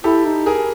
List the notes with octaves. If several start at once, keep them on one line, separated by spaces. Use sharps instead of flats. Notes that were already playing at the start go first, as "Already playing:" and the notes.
E4 G4 A4
D#4
G#4 A#4